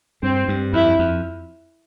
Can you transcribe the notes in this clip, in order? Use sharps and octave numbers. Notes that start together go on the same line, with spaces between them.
G2 C4
G2
F2 E4
F2